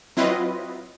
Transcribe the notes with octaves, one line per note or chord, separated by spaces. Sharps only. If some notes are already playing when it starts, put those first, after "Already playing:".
F#3 C4 E4 F4 B4 D#5